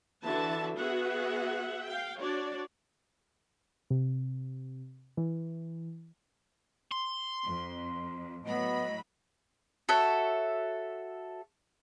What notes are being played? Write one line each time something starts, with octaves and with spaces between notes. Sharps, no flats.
D3 E3 F#4 E5 A5
B3 F#4 G#4 E5 F#5
F5 G5
D4 F#4 C#5 D5
C3
E3
C6
F2
A2 F#3 B3 D#5 B5
F#4 A4 C#5 E5